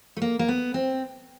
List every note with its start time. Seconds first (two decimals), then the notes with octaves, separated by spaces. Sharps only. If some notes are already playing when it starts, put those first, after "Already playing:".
0.17 A3
0.22 A#3
0.39 A#3
0.48 B3
0.74 C4